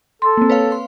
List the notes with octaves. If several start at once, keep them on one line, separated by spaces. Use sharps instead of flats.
A4 C6
A#3 C4
B4 C#5 F5
C6